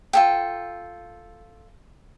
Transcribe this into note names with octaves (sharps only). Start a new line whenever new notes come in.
F4 A4 G5